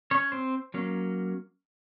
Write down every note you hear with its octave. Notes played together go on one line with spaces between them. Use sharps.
C#4 C#5
C4 C5
F#3 A#3 C#4